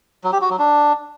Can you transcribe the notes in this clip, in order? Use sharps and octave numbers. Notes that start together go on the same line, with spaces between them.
F#3
G4
F#4
F#3
D4